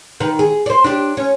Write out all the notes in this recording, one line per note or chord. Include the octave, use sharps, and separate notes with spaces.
D#3 B4
G#4
C5 D5
D4 G4
C#4